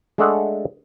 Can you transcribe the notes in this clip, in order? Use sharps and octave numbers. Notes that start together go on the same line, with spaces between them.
G#3 A3 D4 A4 D#5 F#5